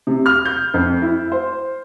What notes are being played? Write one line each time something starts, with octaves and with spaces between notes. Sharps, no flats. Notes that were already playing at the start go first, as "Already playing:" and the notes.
C3
F6
G6
F2
E4
C5